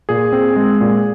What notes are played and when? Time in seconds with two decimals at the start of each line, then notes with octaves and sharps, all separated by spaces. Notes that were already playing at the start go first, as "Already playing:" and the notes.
0.09 A#2 G#4
0.32 C4
0.56 G#3
0.81 A#2